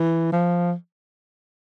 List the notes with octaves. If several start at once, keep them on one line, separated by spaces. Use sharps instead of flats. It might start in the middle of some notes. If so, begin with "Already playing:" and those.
Already playing: E3
F3